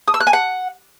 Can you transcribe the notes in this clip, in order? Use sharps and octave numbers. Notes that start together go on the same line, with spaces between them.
D#6
E6
F#6
G#5
F#5